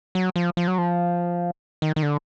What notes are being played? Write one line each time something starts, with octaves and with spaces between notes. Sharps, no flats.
F#3
F3
F3
F#3
F3
D#3
D#3
D3